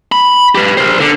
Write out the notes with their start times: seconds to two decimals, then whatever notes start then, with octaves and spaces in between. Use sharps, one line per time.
0.12 B5
0.55 G4 B4
0.77 A#4 C5
1.00 D3